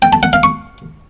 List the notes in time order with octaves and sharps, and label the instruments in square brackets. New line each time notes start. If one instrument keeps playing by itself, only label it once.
[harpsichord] G5
A5
F#5
F5
C#6